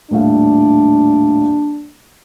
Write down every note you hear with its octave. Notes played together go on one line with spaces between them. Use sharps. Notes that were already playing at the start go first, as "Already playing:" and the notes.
D#1 A2 D4 F5